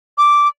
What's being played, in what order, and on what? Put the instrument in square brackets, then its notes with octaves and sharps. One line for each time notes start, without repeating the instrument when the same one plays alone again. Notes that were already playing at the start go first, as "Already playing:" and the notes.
[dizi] D6